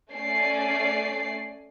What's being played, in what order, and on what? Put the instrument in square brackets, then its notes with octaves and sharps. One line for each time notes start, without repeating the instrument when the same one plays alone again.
[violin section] A3 C#4 D5 C7